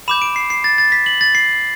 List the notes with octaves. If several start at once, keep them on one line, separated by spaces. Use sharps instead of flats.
B5 D6 G6 E7
D7
C7
C7
A6
A6
B6
F#7
A6
C7